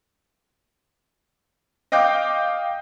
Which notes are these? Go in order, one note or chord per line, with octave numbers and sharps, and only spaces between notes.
D#5 F5 G5 D6 G6